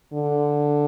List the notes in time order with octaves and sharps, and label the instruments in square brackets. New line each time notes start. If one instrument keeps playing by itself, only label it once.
[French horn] D3